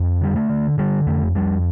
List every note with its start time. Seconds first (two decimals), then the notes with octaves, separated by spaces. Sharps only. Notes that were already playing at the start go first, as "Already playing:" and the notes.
Already playing: F2
0.21 D3 G3
0.36 A3
0.49 D3
0.78 D3 G3
1.07 F2 A3
1.35 F2 G3